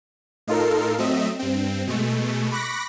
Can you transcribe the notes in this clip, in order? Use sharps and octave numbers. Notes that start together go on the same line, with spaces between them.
A2 D#4 F4 A4 A#4 C7
F#3 A3 C4 D#5 E5
G2 C4
B2 G#3 A3
B5 C#6 D6 F#6 A#6 B6